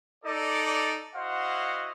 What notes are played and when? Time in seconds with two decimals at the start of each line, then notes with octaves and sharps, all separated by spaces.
0.25 D#4 A4 D5
1.15 E4 F#4 C5 D#5 F5 F#5